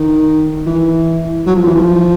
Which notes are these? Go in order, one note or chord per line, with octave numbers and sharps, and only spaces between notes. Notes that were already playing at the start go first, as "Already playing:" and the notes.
Already playing: D#3
E3
F#3
F3
E3
F3